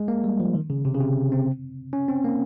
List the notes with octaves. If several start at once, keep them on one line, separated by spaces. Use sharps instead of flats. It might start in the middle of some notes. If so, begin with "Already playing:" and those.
Already playing: G#3
A#3
G3
F3
D#3
C#3
C3
C#3
C3
C4
C#4
C4
A#3